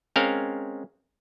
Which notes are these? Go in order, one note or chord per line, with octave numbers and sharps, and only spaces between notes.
G#3 C4 C#4 A#4 F5